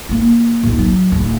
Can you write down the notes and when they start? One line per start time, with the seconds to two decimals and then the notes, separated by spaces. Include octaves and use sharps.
0.09 A#3 F4
0.63 A#1 D#2
0.79 F#3
1.12 D1